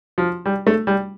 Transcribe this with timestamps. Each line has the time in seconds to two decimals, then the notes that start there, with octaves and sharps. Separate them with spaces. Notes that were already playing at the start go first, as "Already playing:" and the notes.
0.18 F3
0.46 G3
0.67 A3
0.87 G3